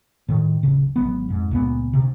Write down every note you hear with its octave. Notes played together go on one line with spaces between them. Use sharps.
A2 D#3
D1 C#3
G#1 F#3 B3
F2 G#2
C#2 A#2 B3
D2 C3